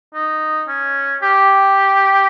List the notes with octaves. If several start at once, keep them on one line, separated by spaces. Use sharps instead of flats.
D#4
C#4
G4